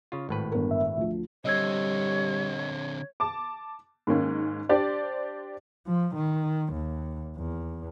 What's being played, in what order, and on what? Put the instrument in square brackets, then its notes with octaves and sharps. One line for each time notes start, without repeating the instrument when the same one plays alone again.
[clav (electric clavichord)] C#3 F4
G#1 A2 B4
[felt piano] G1 A#4
[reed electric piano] E5
[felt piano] D2 F3
[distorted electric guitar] D3 C4 [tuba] G3 [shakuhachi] C#5 [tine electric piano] D#5 E6 G#6
[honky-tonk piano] A5 D6
G#2 D#3 A#3 C#4
D4 G4 C5 D5
[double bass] F3
D#3
D#2
E2